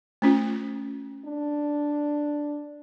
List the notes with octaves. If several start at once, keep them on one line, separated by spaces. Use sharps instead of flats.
A3 C#4 F4
D4